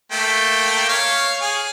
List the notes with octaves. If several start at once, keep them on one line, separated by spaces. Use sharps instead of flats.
A3 A#3 G5
C#5 F5
G#4